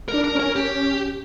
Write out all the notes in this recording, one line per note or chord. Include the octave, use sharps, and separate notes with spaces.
A#4
D4
A#4
C#4
A#4
G4